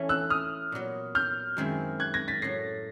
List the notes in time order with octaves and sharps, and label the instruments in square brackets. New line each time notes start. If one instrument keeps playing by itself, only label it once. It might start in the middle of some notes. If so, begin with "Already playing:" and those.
Already playing: [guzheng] E3 A3 C#4 E4
[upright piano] E6 F#6
D#6 F6
[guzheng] A#2 F#3 B3
[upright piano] F6 G6
[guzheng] F#2 D#3 G#3 C4 E4
[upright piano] F#6 G#6
G#6 A#6
A6 B6
[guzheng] A2 F#3 [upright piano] A#6 C7